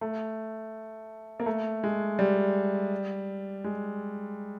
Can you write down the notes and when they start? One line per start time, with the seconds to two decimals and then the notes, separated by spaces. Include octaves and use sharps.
0.01 A3
1.40 A#3
1.46 A3
1.84 G#3
2.19 G3
3.64 G#3